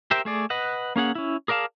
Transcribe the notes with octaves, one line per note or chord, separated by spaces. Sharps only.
G4 A#4 C5 E5 G5
A3 G#4 D5
B4 D#5 F#5
A#3 C#4 G#4 F#5
C#4 E4
G#4 A#4 D5 F5 A5